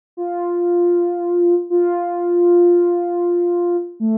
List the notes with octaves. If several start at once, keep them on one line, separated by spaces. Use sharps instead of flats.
F4
F4
A3